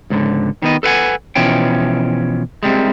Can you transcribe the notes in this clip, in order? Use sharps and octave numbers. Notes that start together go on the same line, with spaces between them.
C#2 G#2 D3
D#3 B3 D#5
A4 B4 C5 F#5 G#5
B2 E3 F3 C#4 G5
C2 C3 G3 G#3